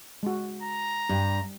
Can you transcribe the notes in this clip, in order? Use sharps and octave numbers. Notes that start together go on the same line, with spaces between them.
G#3 F#4
A#5
G2 G4